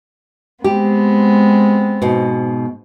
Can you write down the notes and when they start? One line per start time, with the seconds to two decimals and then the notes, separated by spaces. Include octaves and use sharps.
0.64 G#3 B3 C4 G4
2.02 G#2 B2